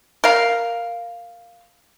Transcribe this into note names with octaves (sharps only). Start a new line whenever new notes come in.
A#4 F5